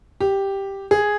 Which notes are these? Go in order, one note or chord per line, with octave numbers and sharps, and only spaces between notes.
G4
G#4